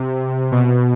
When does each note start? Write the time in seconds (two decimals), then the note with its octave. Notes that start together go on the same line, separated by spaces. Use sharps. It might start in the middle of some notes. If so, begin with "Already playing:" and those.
Already playing: C3
0.52 B2